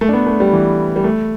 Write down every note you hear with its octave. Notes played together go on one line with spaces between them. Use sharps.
A3
D4
B3
A3
G3
E3
G3
A3